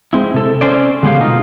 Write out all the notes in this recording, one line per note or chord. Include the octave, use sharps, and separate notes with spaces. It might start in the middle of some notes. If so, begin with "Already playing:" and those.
G#3 C4 E4
C3 A4
C4 C#4 C5 D5
D3 G#3 B3 C#4 G4 F5
B2 D#4 F4